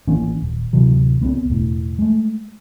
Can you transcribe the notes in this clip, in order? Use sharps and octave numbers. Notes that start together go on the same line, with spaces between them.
A1 E3 A#3 C#4
D#1
D1 C3 E3 F#3
C#2 B3 C4
E1 A2
G#3 A3